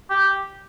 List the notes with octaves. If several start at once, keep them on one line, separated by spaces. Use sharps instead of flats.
G4